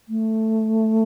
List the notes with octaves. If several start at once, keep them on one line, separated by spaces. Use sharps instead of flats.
A3